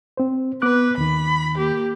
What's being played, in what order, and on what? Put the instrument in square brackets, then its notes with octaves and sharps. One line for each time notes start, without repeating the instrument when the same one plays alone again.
[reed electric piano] C4 C5
[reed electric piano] B3 D6 F#6 [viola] B4
[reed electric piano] D#2 D#3 [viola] B5
[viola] A#3 G4